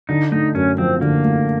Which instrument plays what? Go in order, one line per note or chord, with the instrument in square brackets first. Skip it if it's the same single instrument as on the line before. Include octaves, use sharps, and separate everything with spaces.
[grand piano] D3 [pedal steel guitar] D#4
[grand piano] A3 [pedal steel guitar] D#4
[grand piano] F#2 [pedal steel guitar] C#4
[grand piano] F3 [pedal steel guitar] C4
[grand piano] D3 [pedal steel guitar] A#3
[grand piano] A3